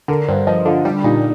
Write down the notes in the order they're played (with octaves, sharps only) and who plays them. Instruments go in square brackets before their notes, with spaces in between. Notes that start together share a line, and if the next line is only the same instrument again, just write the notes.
[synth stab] D3 [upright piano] A#4
[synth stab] G2 [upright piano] C5
[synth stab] F3 [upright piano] D#5
[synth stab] D3 [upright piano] F4
[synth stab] G3 [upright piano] D4
[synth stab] A#2 [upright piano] D#4